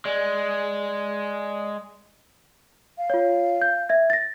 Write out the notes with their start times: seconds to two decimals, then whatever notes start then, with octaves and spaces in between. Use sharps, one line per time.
0.05 G#3 D5
2.98 F5
3.10 F4 C#5
3.61 G6
3.89 E5 G#6
4.10 A6 A#6